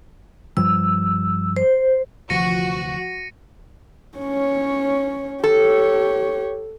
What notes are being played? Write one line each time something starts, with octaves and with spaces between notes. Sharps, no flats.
G2 F3 G3 E6
C5
D2 C3 E3 F3 F#4 A#6 C#7 D#7
C#4 C#5
G4 A4 C#5